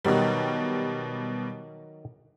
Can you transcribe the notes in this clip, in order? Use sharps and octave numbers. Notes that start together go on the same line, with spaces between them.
B2 D#3 F#3 G3 B4